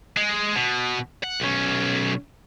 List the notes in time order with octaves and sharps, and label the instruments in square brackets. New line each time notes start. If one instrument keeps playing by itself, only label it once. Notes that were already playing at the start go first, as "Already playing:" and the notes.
[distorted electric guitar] G#3
B2
F#5
B1 C#4